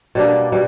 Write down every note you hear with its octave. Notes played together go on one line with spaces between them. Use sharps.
B2 G3 A#3 D4
B2 G3